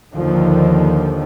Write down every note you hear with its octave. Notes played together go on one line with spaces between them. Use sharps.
D#2 D3 D#3 F3